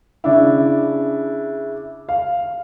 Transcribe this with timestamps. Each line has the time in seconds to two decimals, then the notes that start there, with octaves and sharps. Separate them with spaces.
0.24 C#3 D4 E4
2.09 F5